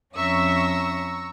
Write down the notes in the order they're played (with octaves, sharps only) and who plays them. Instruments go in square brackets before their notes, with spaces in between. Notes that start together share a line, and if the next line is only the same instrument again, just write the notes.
[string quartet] F2 C#4 [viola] E5 [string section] A#5 C#6 E6